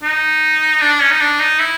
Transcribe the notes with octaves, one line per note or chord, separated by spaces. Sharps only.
D#4
D4
C#4
D#4
D4
D#4
E4